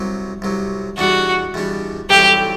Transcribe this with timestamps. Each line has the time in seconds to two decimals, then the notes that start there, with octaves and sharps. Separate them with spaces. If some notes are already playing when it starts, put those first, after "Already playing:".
Already playing: C2 C3 F#3
0.42 C2 C3 F#3
0.98 E2 B2 G3 D4 F#4
1.54 E2 B2 G3 D4
2.10 B1 A2 E3 G3 C4 G4